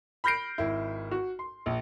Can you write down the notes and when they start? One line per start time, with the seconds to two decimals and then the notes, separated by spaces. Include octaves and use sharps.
0.24 B5 F6 G6 A#6 C7 D7
0.58 G#1 E4
1.11 F#4
1.39 C6
1.66 A#1